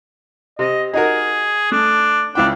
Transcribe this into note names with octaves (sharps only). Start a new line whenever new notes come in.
C3 D#5
D#4 F#4 G#4 A#4
A3 D4
C#2 D4 E4 G5